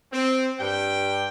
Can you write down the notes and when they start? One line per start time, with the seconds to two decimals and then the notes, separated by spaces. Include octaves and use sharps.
0.13 C4
0.60 G2 G5